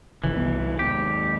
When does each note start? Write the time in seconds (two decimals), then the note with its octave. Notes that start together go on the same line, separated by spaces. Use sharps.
0.24 G1 C#3 E3 F3
0.36 C2 B3
0.79 D#2 G#2 G4